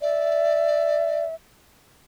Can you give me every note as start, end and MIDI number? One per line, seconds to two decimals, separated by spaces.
0.01 1.25 74
0.01 1.35 76